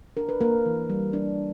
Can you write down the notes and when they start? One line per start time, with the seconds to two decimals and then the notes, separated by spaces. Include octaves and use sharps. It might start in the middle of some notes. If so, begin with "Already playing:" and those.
0.17 D4 A#4
0.29 B4
0.41 A#3 A#4
0.66 E3
0.90 G3
1.13 D4